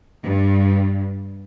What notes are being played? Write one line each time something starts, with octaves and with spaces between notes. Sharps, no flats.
G2